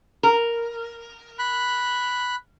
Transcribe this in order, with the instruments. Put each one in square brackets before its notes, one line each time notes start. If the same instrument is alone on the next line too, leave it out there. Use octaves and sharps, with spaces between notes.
[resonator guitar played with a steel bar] A#4
[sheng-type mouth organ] B5 F#6